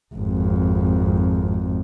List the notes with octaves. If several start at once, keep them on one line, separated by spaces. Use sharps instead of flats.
G#1 F2